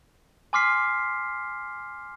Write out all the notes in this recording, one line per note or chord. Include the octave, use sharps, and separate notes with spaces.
G#5 C6 D6 F6 B6 C7